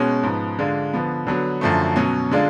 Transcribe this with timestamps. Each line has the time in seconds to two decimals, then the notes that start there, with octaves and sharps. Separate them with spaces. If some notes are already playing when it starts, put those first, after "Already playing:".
Already playing: B2 G#3 C#4 F#4
0.23 G#2 F3 B3
0.59 D3 G#3 D4 F4
0.93 D3 F3 B3
1.27 D3 F#3 B3
1.61 F#2 D3 F3 A3
1.96 B2 F#3 C#4
2.31 D3 G#3 D4 F4